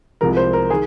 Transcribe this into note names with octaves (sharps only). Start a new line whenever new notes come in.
C2 C3 F3 G#3 A#4
C5
A#4
D#3 G#4